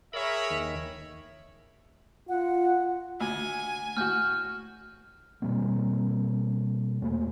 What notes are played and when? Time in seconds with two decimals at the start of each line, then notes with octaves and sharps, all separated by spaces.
0.13 G#4 A#4 C#5 E5 B5
0.50 D#2 D#3
2.29 F4 F#5
3.20 D2 G#5
3.97 A2 F#4 F6 G6
5.42 B2 G3 A#3 C4
7.01 E2 A3 A#3